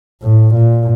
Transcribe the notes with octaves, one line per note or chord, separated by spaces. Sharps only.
A2
A#2